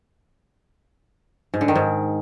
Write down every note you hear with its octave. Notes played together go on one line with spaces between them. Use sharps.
G#2
D3
D#3
G#2